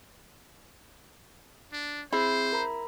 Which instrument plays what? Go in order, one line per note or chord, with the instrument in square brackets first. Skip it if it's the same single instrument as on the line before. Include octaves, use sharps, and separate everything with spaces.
[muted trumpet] D4
[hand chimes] C4 G#4 C7 [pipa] E4 [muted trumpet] C5
[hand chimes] A#4 A#5 B5